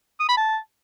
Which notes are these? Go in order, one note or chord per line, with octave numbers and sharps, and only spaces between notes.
D#6
B5
A5